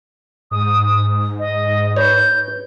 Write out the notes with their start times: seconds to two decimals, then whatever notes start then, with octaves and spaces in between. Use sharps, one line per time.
0.51 G#2 D#6
1.39 D#5
1.96 B4 C#5 G6